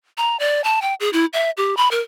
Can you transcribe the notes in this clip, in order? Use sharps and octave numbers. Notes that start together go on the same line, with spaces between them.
A#5
D5
A5
G5
G#4
E4
E5
G4
B5
A#4